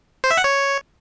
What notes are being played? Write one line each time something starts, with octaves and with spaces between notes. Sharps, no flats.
C5
E5
F#5
C#5